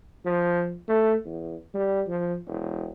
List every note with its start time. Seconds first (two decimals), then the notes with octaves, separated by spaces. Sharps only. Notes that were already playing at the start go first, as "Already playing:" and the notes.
0.25 F3
0.87 A3
1.25 E2
1.74 G3
2.07 F3
2.47 E1